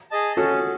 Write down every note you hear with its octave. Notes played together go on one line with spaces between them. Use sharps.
G#4 D#5 A5
C#4 F#4 A4